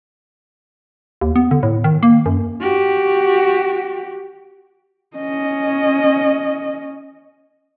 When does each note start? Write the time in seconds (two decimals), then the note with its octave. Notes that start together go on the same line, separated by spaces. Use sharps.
1.21 D#2
1.36 B3
1.51 D3
1.63 A2
1.84 D#3
2.03 A#3
2.26 F#2
2.60 F#4 G4
5.17 C#4 D#5